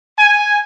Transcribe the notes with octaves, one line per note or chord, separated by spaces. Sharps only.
G#5